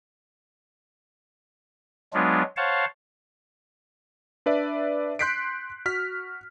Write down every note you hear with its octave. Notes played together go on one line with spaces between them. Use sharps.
F#3 G#3 B3 D4 F4
C5 C#5 F5 F#5 A5
D4 B4 D5 E5
C6 F#6 G6 B6 C7 D7
F#4 F6 B6